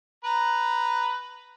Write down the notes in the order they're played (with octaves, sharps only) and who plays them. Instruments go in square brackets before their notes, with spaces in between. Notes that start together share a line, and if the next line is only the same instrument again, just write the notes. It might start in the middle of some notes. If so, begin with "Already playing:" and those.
[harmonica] B4 A#5